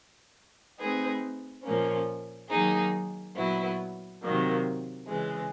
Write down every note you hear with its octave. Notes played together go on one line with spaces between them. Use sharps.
A3 C4 D#4 G#4 B4
A#2 F3 A#3 C#4
D#3 F#3 A#3 D#4 G#4
A#2 F#3 B3 E4
C3 D#3 F#3 A#3
C#3 E3 G#3